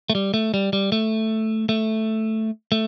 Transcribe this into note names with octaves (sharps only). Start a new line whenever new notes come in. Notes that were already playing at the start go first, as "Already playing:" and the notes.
A3
G3
A3
G3
G3
A3
A3
A3